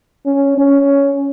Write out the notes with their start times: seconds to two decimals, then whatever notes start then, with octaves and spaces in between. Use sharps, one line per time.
0.26 C#4
0.58 C#4